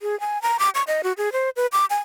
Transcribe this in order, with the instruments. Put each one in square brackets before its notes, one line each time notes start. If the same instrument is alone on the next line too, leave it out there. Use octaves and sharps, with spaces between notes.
[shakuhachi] G#4
G#5
A#5
D6
C#6
D#5
F#4
G#4
C5
B4
D6
G#5